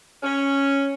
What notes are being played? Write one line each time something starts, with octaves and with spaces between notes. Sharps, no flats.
C#4